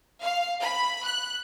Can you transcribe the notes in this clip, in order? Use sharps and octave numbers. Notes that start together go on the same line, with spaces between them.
F5
B5
F#6